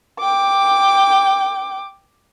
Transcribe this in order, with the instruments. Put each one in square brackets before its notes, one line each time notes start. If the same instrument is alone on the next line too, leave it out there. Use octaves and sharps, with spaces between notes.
[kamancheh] G5 D6